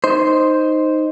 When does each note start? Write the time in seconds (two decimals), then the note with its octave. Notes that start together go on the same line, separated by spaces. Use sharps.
0.04 D#4 C5